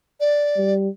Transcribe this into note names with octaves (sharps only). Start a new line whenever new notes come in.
D5
G3